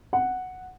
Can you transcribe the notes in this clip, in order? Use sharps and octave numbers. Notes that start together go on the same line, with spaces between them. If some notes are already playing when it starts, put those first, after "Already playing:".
F#5